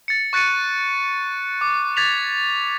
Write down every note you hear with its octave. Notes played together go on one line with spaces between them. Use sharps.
A6 C#7
C#6 F#6 A6 C#7 D#7
D6
D6 G#6 A6 B6 F7